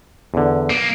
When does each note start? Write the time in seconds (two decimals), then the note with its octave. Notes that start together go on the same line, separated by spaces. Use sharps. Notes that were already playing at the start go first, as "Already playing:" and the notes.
0.34 E2 D3
0.70 B1 A#3